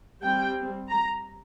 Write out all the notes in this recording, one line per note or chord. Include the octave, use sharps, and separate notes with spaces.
G3 C4 G5
A#5